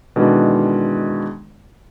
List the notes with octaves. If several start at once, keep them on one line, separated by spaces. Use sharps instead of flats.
B2 D#3 E3 G#3 D4 A4